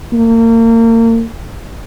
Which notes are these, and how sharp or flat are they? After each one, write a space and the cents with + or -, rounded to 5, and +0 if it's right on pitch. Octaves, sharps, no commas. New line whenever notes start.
A#3 -35